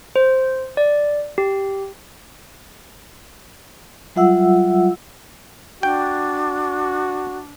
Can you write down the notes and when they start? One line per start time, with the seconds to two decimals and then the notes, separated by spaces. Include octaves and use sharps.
0.16 C5
0.77 D5
1.38 G4
4.16 F#3 G3 F4 E5 F#5 E6
5.83 D4 F#4 G5